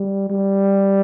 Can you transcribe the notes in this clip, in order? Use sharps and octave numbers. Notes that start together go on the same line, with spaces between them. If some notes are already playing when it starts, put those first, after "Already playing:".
Already playing: G3
G3